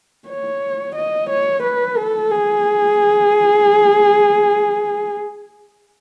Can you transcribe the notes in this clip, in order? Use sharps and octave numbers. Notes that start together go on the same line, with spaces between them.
C#5
D#5
C#5
B4
A4
G#4